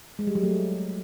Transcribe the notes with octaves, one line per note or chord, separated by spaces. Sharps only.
G#3
G3
F#3
A3